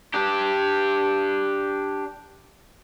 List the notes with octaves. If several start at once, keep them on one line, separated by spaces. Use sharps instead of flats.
D4 G4